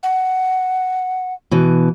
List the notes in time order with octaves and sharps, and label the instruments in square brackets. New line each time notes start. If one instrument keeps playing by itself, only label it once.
[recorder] F#5
[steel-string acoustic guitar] B2 E3